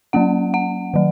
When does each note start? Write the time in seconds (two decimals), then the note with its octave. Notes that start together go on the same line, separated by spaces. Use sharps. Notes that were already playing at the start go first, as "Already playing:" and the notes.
0.13 F#3 A#3 C#4 F#5
0.54 F#5
0.94 D#3 F#3